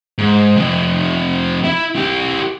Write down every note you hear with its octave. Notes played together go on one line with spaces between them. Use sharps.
G#2
F2 C3
E4 E5
E4 G4